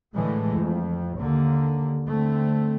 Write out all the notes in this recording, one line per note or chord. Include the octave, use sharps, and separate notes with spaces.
A2 D3 E3 G#3 A3
F2
D#2 D3 A#3
D3 A3 C4